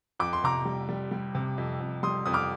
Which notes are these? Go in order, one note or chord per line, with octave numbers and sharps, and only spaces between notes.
F2 D6
C6
C3 A#5 D6
G3
G3
G3
C3
F2
F2
G3 C6 D#6
F2 D#6
D6 F6